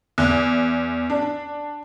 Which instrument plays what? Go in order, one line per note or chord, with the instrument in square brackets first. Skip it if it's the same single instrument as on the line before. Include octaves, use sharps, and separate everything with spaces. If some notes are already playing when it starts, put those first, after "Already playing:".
[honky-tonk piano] E2
D4